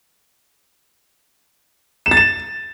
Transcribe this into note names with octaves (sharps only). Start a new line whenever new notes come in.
E7
A6
E7